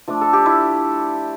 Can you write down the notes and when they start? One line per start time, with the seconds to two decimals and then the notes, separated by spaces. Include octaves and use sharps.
0.08 F3 A3 D4
0.21 A4
0.33 G4
0.46 E4